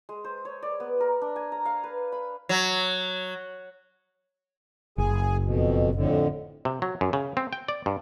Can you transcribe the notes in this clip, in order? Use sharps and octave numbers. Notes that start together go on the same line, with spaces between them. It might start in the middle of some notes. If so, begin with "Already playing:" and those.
G#3
C5
C#5
D5
B3
A#4
D4
G#5
A#5
F5
B4
B5
F#3
F#1 G#4 G#5
F2 B2
F2 A2 D3
C3
F#3
F#2
C#3
C4
G5
D5
G2